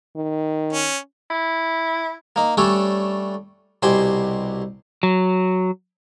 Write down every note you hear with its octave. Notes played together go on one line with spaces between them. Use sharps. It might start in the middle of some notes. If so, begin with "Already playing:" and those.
D#3
C#4
E4
A#3 D#4
G3 A3 C#4 D4 A4 C#5
C2 B2 G4 C5 G#5 C6
F#3